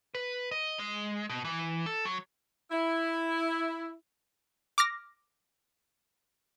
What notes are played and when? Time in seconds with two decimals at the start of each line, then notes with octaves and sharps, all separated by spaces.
0.15 B4
0.51 D#5
0.79 G#3
1.30 B2
1.45 E3
1.86 A4
2.05 F#3
2.71 E4
4.78 D6 F6 A#6